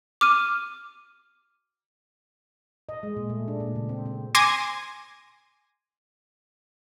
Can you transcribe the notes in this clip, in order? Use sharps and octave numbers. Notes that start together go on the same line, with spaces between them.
D6 F6 D#7
D#5
G#3
A#2
A3
D4
A#2
C#3
C4
C4
G#5 C6 D6 G#6 A#6 D#7